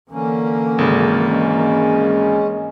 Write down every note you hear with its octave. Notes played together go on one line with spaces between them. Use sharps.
D3 E3 A#3 C#4
G#1 C#3
G#3 C#4